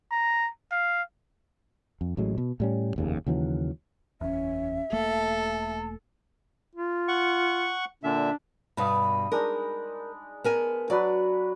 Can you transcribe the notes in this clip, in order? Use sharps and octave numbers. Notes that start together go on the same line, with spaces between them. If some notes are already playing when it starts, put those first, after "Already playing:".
A#5
F5
F2
A1 A2 F#3 G#3
B2
A2 G3 C#4
F1 D#2 C#3
D#2 C#3 E3 F#3
F#1 E2 C#4 E5
E1 A3 A#3 A4 A5
F4
F#5 C#6
A#2 D3 D4 E5
G2 B2 B5 D#6
G#3 D4 D#4 A#4
B3 A#4 G#5
F#3 D4 B4 D5